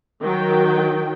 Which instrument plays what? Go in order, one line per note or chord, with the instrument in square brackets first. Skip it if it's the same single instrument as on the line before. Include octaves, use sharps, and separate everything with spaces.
[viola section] D#3 F#3 G5